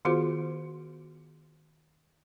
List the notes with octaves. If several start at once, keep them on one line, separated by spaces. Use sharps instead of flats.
D#3 B3 F4 F#4 G#4 C5